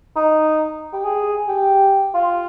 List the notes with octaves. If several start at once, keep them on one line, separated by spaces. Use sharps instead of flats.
D#4
G4
G#4
G4
F4